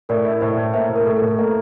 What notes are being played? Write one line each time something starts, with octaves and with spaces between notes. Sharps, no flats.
A2 A#4 D5
E4
A2 C5 E5
A2
A#3 C5 E5
A2
A#4
A2 A4
A4
A2
A4
A#3 A4